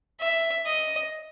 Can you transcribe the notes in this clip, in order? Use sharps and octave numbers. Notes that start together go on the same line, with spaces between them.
E5
D#5